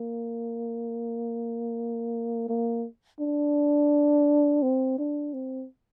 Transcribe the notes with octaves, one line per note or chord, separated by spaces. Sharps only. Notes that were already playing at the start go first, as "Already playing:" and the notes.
Already playing: A#3
A#3
D4
C4
D4
C4